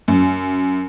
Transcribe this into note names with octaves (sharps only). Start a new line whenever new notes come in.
F#2